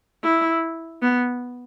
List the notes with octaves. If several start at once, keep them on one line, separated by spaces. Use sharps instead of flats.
E4
B3